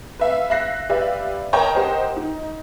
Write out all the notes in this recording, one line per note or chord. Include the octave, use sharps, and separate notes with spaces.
B4 E5 F5
E5 F5 F#6 A#6 C7
G4 B4 D5 E5 F5
A#4 C#5 D#5 G5 A5 A#5
G4 A#4 C5 D#5 F#5 G5
D#4